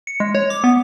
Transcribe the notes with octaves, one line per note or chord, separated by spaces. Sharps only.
C#7
G#3
C#5
D6
B3